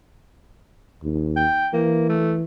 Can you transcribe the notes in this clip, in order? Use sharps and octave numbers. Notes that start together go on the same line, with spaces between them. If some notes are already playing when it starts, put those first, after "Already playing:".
D#2
G5
E3 A#3
A3